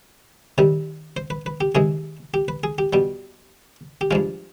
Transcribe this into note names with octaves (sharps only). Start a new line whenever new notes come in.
C3 D#3 G3
C5
B4
B4
G4
C3 D#3 G#3 G#4
G4
B4
G#4
G4
B2 G3 G4
G4
G2 F3 G#3 F4